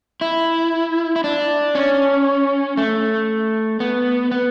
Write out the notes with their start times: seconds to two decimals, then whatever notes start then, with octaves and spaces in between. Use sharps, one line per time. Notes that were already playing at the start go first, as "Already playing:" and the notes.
0.21 E4
1.16 E4
1.24 D4
1.75 C#4
2.77 A3
3.80 B3
4.31 B3